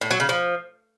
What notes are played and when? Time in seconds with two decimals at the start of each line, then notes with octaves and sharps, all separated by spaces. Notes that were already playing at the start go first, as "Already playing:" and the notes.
0.01 A2
0.11 F#3
0.20 C#3
0.29 F3